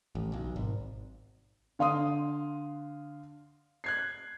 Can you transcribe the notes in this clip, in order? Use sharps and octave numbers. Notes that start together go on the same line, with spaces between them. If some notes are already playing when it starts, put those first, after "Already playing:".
A1
B1
G#1
D3 F5 C6 D#6
F#6 G#6 C7